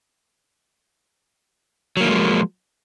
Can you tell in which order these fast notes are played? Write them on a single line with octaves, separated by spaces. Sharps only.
F#3 A#3 D#3 G#3 F3